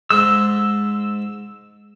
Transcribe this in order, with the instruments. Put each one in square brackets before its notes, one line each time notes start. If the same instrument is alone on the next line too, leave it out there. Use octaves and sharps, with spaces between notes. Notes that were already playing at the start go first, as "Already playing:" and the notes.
[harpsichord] G#2 G#3 [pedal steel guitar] E6